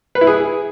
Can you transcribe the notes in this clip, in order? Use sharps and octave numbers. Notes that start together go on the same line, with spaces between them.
B4
E4
G#4